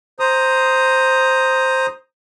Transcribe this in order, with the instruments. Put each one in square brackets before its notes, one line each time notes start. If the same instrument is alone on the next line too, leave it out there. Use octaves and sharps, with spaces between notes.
[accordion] C5 A#5 D#6